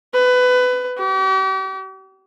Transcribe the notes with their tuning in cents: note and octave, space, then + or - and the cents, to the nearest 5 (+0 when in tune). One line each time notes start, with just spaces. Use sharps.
B4 +20
G4 -40